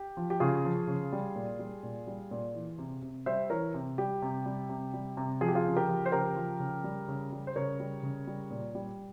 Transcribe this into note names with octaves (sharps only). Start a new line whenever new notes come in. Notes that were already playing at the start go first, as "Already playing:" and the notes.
Already playing: G4
F3
G4
C#3 F4 G#4
F3
C#3
G3
A#2
G3
A#2
G3
A#2
E3
C3
C3
G3 C5 E5
E3 A#4 C#5
C3
G3 G4
C3
G3
C3
G3
C3
F3 G#4
G4
F4 G#4
C#3
G4 A#4
F3
C5
C#3 G4 A#4
F3
C#3
G3
C#3
G3
C5
C#3 A#4 C#5
G3
C#3
G3
A#2
G3